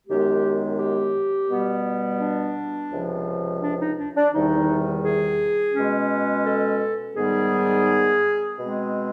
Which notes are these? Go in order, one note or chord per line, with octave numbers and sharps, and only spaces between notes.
F#2 D#3 G#3 B3 G4
G4
B2 G3 B3
D4
C#2 C3 F3
D4
D#4
D4
D4
E2 C3 D#3 G3 D#4
G#4
B2 G#3 C#4
A4
G#2 D#3 G3 B3 G#4
B2 G#3 C4